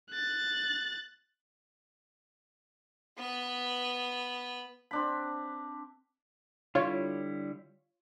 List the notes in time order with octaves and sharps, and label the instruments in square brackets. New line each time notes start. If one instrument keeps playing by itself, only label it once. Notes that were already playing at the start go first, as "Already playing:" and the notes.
[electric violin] F#6 A6
[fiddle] B3 B4
[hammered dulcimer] C4 D4 B5
[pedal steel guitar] D3 G3 E4 [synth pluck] F4 C#5